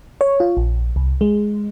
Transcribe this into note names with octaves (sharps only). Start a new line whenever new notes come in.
C#5
F4
A#1
C2
G#3